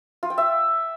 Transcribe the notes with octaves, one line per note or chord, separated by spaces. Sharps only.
F4
G5
E5